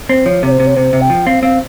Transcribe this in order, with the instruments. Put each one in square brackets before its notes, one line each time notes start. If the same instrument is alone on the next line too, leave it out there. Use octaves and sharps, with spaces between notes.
[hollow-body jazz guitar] C4 [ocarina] C5
[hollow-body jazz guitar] F3 [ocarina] C#5
[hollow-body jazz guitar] C3 [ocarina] C#5
[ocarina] C5
[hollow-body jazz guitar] C3
[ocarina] C#5
[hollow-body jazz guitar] C3 [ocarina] C5
[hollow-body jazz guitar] C3
[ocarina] G5
[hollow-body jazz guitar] F3
[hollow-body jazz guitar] C4 [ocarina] F5
[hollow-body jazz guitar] C4 [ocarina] F5